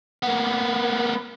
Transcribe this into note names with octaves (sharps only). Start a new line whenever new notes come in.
A#3 B3